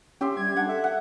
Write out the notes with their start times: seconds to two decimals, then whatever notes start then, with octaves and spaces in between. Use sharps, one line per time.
0.21 C#4 G4 E5 C6
0.37 G3 G#6
0.56 D4 F#5
0.69 A4 E5
0.84 F#5